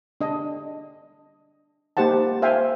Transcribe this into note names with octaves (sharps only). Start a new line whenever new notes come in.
D4 D#5
A#3 D#4 G4 C5 F#5 A5
C5 E5 F5 G5 G#5